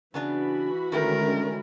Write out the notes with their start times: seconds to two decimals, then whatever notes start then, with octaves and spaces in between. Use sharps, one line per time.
0.14 C#3 E3 B3 D4 F#4 B5
0.92 D3 D#3 G#3 A3 C#4 A#4 G5